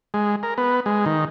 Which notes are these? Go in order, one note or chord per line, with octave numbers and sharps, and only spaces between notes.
G#3
A#4
B3
G#3
D#3